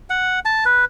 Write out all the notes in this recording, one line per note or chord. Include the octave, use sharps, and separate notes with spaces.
F#5
A5
B4